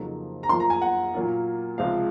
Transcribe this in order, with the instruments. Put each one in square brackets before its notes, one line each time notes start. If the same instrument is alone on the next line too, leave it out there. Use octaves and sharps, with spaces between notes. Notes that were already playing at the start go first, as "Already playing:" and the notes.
Already playing: [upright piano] F2 C#3 F#3 A#3 D#4
[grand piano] A#5
[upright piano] F#2 F3 A#3 F4 A#4 [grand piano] C6
[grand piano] A#5
G#5
F#5
[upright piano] A#2 F#3 A#3 F4 A#4
[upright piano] C#2 C3 F3 G#3 C4 [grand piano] F5